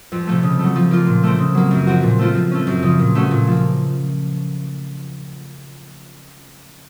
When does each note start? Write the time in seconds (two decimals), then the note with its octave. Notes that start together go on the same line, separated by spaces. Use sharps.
0.12 F2
0.27 C3 F3 A3
0.43 C#3
0.59 F#3 A3
0.76 F3
0.91 A#3 F4
1.07 A#2
1.23 A3 C4
1.38 C#3
1.55 F#3 A#3
1.71 F#2
1.87 F3 C4 F#4
2.03 A#2
2.19 A3 C4 F4
2.35 F3
2.51 A3 C#4
2.67 F#2
2.83 C#3 F3
2.99 A#2
3.15 A3 C#4 F#4
3.31 A#2
3.47 F3 A#3